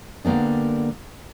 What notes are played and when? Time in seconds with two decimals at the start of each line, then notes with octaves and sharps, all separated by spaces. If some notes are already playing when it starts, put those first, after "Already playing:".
0.24 D3 G3 A#3 B3 D4